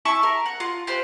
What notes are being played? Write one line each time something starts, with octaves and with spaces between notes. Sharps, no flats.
E4 E5 A5 C#6
A#4
F#5
F4
F4 G4 B4 C5